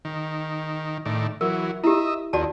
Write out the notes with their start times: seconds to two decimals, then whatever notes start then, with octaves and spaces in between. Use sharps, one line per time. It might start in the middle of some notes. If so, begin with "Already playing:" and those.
0.05 D#3
1.06 A2 D#3 D5
1.41 E3 F#3 A#4
1.84 E4 G4 D#5 E5
2.33 D#2 F#4 D5 A5